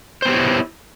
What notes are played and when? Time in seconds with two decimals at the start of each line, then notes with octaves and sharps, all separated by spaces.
0.22 C5
0.25 B3
0.28 G4
0.31 C#5
0.34 E4